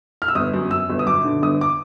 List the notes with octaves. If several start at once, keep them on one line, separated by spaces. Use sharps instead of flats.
F6
E6
G1 D#6
F#2
F#2 E6
G1
D#6
F#2 D6
D3
G1 D#6
D6